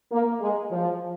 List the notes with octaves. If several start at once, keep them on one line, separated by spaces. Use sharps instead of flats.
A#3
G#3
F3